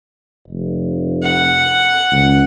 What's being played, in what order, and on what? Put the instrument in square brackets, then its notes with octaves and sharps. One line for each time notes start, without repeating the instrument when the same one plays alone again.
[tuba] F1
[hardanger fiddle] F#5
[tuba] C#2